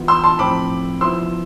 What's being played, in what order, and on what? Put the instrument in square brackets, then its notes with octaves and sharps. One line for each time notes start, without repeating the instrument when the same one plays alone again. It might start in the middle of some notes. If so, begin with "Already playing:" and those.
Already playing: [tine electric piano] E3 B3 F4
[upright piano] C6 E6
A5 C6
[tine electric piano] A2 F3 C4 [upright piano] B5 D6
[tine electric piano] F3 B3 E4 [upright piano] C6 E6